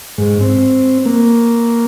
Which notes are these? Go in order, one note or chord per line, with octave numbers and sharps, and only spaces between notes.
G#2
C4
A#3